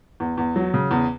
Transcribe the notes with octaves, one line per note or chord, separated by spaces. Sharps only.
E2
E2
F#3
C#3
E2